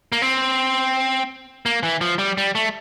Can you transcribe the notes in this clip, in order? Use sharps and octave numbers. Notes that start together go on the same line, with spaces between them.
A#3
C4
A#3
E3
F3
G3
G3
A3